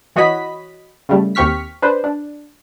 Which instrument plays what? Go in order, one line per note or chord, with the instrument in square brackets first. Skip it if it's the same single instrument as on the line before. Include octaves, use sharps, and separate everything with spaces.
[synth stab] E3 F#4 C#5 D#5 B5 B6
C#3 G3 A3
D#2 C4 G4 C#6 F6 B6
D4 B4 C5
D4